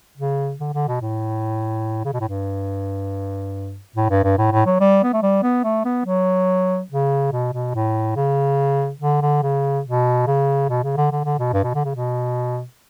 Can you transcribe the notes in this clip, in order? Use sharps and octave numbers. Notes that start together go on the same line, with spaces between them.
C#3
D3
D3
B2
A2
C#3
B2
A2
G2
A2
G2
G2
A2
A2
F#3
G3
B3
A3
G3
B3
A3
B3
F#3
C#3
B2
B2
A2
C#3
D3
D3
C#3
B2
C#3
B2
C#3
D3
D3
D3
B2
G2
B2
D3
C#3
B2